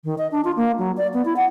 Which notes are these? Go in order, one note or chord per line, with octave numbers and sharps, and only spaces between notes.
D#3
D#5
D4
F4
A#3
F#3
D5
B3
E4
F#5